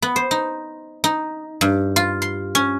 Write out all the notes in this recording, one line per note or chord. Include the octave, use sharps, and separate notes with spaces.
B3
C5
D#4
D#4
G2
F4
C6
C#4